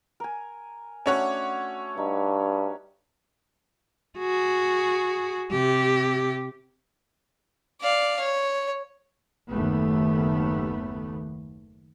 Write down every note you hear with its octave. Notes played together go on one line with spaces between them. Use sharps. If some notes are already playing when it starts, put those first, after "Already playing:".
A#4 G#5
A3 C#4 D4 F#4 C#5 F#5
G2 D#4
F#4 G#4
C3 G4
D5 F5
C#5
F#1 D#2 A3 B3